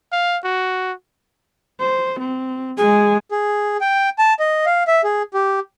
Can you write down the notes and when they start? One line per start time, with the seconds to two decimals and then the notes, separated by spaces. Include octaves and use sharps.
0.12 F5
0.44 F#4
1.80 C5
2.20 C4
2.78 G#3 G#4 G#5
3.31 G#4
3.81 G5
4.18 A5
4.39 D#5
4.66 F5
4.87 E5
5.04 G#4
5.34 G4